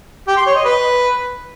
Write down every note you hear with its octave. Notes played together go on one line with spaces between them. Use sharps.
G4
C6
C#5
D#5
B4